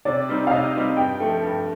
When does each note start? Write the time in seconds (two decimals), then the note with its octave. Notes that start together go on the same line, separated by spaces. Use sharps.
0.05 C3 D5
0.29 G3 C4 D#4
0.47 F5
0.51 C3 D#5
0.74 G3 C4 D#4
0.97 G2 G5
1.20 F3 A3
1.43 G2